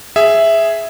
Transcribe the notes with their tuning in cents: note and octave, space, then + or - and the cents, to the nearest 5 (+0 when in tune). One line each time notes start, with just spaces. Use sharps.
G#4 +0 E5 +0